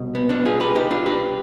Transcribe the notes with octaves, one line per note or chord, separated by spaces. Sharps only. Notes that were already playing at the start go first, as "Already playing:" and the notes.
Already playing: C2 B2
B3
B3 D4
F4 G#4
G4 B4
D#4 G4
D4 F4
G4 B4